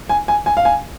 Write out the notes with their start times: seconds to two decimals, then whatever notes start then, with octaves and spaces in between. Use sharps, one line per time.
0.09 G#5
0.28 G#5
0.46 G#5
0.57 F5
0.65 G#5